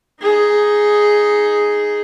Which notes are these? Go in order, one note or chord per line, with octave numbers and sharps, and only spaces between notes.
D#4 G#4